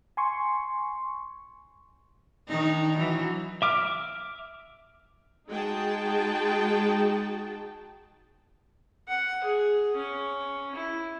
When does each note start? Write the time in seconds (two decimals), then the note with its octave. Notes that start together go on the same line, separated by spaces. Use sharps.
0.17 G#5 C6 C#6
2.48 D#3 D4 D#4
2.98 E3 F#3
3.62 E5 D6 F6
5.48 G#3 D#4 F#4 G#4 G5 A5
9.09 F#5
9.44 G#4
9.97 C#4
10.75 E4